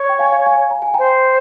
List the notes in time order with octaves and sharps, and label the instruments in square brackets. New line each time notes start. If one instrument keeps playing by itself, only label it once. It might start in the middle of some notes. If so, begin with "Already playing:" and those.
Already playing: [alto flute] C#5
[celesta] G5
F5 G#5
F5 G#5
F5 G#5
A#5
G#5
[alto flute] C5 [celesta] G5 A#5